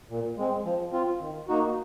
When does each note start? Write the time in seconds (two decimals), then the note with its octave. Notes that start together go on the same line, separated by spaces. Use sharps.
0.10 A#2
0.38 G#3 C4
0.65 F3
0.93 C4 F4
1.20 D#3
1.48 A#3 D#4 F#4